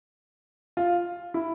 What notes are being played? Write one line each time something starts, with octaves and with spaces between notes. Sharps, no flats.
F4
E4